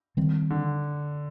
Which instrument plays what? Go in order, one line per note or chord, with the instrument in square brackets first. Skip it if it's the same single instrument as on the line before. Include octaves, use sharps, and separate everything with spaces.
[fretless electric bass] D#3 G3 C4
[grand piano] D3